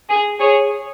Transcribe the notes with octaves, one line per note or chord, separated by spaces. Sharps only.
G#4
G#4 C#5